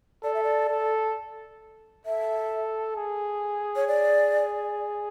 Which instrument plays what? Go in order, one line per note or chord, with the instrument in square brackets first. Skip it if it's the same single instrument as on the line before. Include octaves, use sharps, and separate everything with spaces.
[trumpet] A4 [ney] D5
[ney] E5
D5
[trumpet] A4
[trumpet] A4 [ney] E5
[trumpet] G#4
[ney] C#5
D5